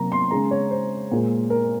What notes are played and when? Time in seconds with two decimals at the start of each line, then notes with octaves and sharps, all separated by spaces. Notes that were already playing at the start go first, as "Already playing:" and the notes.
Already playing: C3 F#3 A#3 A#5
0.12 C6
0.31 C#3 G#3 A#5
0.51 C#5
0.71 C5
1.11 A#2 G#3
1.50 A#4